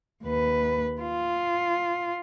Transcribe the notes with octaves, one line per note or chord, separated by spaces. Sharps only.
D#2 B4
F4